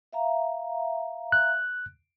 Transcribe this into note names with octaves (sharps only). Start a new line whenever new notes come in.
E5 F5 A#5
F#6